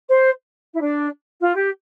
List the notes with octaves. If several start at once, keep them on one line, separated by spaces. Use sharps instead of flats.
C5
E4
D4
F4
G4